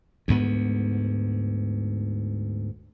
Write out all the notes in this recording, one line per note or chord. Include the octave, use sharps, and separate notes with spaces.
D2 G#2 B3